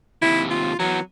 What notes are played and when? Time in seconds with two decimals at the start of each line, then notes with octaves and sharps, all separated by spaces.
0.22 D#2 C3 E4
0.51 F4
0.80 E3 F#3 B3